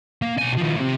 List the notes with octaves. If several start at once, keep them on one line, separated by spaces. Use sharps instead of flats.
A#3
B1 G#5
D#3 F3
A2 C3